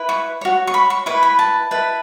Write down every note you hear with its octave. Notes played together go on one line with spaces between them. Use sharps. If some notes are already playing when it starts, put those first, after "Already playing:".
Already playing: E4 B4
C#6
F#4 C#5
C#6
B5
C#6
E4 B4 C#6
B5
A5
E4 B4 A5